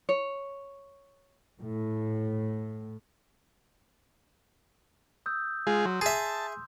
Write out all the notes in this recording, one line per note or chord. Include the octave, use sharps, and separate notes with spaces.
C#5
A2
D#6 E6 G6
G#3 F4 G#4
F#3 C6
G#4 E5 A5